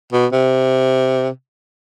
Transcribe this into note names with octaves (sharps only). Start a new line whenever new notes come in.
B2
C3